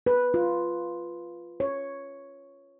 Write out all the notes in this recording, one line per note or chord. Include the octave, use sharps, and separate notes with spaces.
B4
F4
C#5